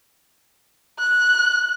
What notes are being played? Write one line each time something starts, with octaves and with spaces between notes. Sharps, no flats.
F#6